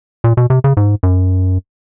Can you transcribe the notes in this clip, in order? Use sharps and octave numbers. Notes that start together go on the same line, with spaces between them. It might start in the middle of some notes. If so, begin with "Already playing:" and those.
A#2
B2
C3
C#3
G#2
F#2